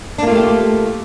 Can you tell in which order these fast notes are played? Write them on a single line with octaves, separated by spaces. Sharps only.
D4 A#3 F4 A3 G4